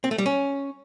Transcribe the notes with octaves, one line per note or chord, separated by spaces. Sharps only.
C4
A3
G3
C#4